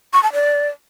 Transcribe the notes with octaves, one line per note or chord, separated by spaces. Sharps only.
C#6
A5
D5